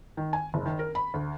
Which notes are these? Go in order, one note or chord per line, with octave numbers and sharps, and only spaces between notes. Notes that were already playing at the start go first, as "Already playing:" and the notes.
D#3
G#5
F#1
D#3
A#4
B5
D2